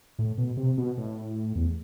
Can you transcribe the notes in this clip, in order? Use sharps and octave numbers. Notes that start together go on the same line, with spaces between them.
A2
B2
C3
B2
A2
E2